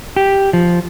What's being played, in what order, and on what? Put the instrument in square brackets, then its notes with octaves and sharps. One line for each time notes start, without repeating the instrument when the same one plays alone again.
[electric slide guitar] G4
F3